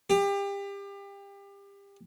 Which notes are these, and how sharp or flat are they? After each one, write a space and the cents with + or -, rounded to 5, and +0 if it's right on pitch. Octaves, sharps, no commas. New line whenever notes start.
G4 +30